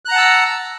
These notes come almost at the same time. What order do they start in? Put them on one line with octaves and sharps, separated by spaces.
F#6 A#5 F#5 A5 E6